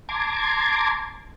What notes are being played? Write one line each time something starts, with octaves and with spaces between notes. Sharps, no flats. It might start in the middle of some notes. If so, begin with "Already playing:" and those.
A5 A#5 C6 D6 G#6